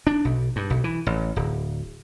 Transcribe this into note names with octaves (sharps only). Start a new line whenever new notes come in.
D4
B1
G2
B1
E3
A1
D1